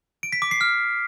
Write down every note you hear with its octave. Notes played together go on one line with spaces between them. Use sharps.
D7
B6
D6
C7
F6